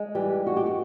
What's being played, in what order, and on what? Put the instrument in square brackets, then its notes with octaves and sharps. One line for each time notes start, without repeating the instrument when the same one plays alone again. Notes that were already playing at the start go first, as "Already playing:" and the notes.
Already playing: [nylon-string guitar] G#3
E3 G3 G4
C3 F#4
G4
F#4